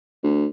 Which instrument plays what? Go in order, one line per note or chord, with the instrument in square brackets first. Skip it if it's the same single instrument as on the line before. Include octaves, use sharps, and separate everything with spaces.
[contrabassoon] D2